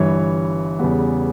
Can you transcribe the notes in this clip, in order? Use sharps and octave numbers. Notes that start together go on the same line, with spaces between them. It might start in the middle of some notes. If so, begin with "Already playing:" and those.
Already playing: G1 G2 E3 C#5
E2 C#3 G3 B3